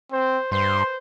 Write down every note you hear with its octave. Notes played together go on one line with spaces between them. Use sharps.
C4 C5
G2 B4 C5 C6